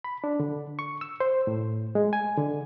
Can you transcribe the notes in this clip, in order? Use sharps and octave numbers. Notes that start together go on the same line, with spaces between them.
B5
D4
D3
C#6
E6
C5
A2
G#3
G#5
D3